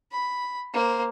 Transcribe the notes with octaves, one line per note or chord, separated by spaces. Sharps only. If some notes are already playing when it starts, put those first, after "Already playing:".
B5
A#3 C5